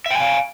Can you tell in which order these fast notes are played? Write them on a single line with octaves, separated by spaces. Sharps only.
E5 G5 G#5 F5